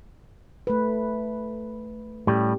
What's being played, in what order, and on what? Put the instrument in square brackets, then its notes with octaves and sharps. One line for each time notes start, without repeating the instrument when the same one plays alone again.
[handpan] A3 B4
[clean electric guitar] A2 G3 [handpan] C#4 G4